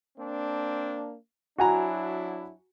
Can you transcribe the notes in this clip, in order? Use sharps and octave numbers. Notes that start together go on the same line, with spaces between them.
A#3 C4 D4
F#3 D4 E4 F#4 G#5 A#5